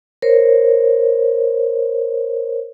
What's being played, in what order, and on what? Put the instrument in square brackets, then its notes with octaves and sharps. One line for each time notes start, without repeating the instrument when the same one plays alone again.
[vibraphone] A#4 C5 C#5